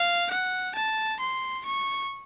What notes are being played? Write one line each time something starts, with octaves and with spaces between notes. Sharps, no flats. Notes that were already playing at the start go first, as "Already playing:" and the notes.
Already playing: F5
F#5
A5
C6
C#6